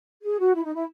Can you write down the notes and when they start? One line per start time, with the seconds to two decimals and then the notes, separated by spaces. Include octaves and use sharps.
0.24 G#4
0.39 F#4
0.54 E4
0.64 D#4
0.74 E4